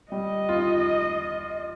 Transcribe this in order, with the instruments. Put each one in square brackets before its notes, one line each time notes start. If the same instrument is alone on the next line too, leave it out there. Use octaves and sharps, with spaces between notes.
[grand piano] G3 [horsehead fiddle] D#5
[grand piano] F4
D#4